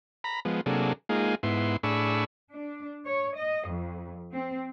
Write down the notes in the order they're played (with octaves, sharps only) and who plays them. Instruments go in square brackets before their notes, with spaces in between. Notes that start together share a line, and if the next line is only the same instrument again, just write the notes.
[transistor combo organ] A#5 B5
F3 G#3 B3
C3 F#3 A#3 D4 G#4 A4
G#3 A#3 D#4 F4 G#4
G#2 B3 E4 C6
A2 D4 G#4 B5 C#6 E6
[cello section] D4
C#5
D#5
F2
C4